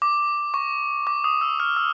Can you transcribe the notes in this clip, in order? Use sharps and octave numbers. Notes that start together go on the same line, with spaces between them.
D6
C#6
D6
D#6
E6
F6
E6